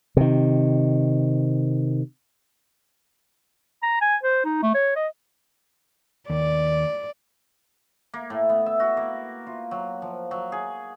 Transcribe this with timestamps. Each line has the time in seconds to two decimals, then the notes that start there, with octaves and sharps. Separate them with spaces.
0.17 C3 D#3
3.83 A#5
4.01 G#5
4.24 C5
4.45 D#4
4.63 A3
4.74 C#5
4.96 D#5
6.30 D#2 D5
8.13 A#3
8.30 A2
8.49 B3
8.66 E5
8.80 F#4
8.97 A#3
9.47 F4
9.71 F#3
10.02 F3
10.31 F#3
10.52 G#4